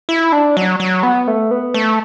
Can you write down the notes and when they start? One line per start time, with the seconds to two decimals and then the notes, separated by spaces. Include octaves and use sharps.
0.09 E4
0.32 D4
0.57 F#3
0.80 F#3
1.03 B3
1.28 A3
1.51 B3
1.74 A3